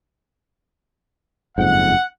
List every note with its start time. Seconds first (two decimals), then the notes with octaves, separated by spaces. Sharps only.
1.58 F#1 F2 G#2 F#5